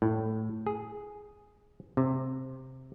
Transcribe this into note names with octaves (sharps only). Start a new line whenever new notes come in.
A2
G#4
C3